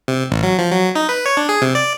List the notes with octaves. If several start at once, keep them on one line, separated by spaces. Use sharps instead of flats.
C3
A1
F#3
F3
F#3
D#4
B4
C#5
D4
G#4
C3
D5